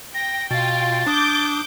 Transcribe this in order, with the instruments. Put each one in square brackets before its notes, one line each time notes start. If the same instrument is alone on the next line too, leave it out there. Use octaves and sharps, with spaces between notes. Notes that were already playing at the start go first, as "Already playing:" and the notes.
[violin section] G5 [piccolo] A#6
[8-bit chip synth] B2 [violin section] F4 G5 [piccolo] A6
[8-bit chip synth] D4 D#6 [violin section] D6 G6